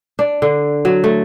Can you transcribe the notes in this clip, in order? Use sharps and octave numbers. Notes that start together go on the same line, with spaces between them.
D4
D3
F#3
A3